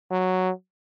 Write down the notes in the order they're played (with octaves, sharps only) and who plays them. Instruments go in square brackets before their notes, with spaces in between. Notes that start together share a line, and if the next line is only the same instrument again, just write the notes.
[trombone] F#3